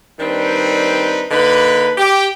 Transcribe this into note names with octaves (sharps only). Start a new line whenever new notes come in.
D#3 G3 C4 D4 D#4 B4
D3 A#3 D#4 B4
G4